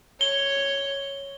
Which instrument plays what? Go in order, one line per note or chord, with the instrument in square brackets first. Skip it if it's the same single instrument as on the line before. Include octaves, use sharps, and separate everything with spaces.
[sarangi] C#5 [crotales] G7